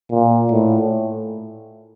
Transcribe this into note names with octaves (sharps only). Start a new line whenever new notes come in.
A#2
A2